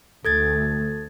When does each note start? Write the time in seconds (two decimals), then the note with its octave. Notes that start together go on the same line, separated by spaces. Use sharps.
0.25 D2 A3 A4 G#6 A6